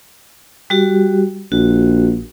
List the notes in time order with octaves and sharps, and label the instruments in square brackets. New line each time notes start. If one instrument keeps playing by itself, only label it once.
[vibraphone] G3 F#4 G4
[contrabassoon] A#1 [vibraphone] F#4